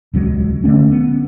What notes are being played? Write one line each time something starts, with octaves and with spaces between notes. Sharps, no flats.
D#1 C#2 F#3 G#3
D3 D#3 A3 C#4
B3